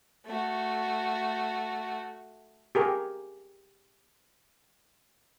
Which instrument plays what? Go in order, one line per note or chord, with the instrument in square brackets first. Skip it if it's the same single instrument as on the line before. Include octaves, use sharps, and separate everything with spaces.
[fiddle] A3 F#4
[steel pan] G4 G#4 A#4